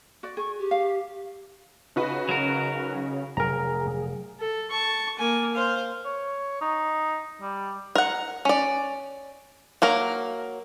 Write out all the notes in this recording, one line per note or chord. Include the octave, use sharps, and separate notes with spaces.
F#4 D5
G#4 C#6
G4
F5
C#3 D#4 F#4 B4
F#3 A#4
F1 F#3 G#4 A#4 A#5
A4
A5 C#6
A#3 G#5
C5 F5
C#5
D#4
G3
A#4 F#5
C#4 D5
F#3 A#3 A#4